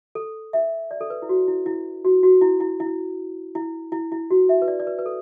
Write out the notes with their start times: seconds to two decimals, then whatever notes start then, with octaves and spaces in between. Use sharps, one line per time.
0.15 A4
0.53 E5
0.91 D5
1.01 A4
1.10 B4
1.22 E4
1.29 F#4
1.48 E4
1.66 E4
2.05 F#4
2.23 F#4
2.41 E4
2.60 E4
2.80 E4
3.55 E4
3.92 E4
4.12 E4
4.31 F#4
4.49 E5
4.62 B4
4.68 D5
4.80 D5
4.87 B4
4.99 B4
5.06 A4